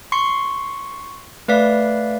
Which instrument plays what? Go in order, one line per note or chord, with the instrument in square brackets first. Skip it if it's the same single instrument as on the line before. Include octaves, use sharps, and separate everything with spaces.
[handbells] C6 C#6 C7 C#7
A3 B4 D5 F5 B6